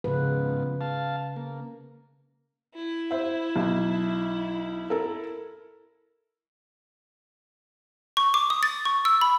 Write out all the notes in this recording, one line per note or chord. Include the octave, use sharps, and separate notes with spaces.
G#2 C#3 F3 B3 B4
F5 A5
A#3
E4
C5 E5
B1
A4 A#4
C#6
D6
D#6
A6
C#6
E6
B5